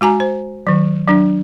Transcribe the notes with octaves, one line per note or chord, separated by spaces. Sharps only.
G#3 F#4 G#5 A#5
C5
D#3 F#3
F#3 D4